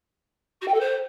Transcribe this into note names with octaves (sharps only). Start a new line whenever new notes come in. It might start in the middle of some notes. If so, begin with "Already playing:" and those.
F#4
G5
A4
C5